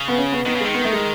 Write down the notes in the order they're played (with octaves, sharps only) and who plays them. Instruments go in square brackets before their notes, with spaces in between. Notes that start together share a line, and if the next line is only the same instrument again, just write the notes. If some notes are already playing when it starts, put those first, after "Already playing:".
Already playing: [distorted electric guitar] C#3
[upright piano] B3
C#4
B3
[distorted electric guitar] D#3 [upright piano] B3
[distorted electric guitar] C#3
[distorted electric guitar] D#3 [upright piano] G#3
[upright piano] B3
A3
G#3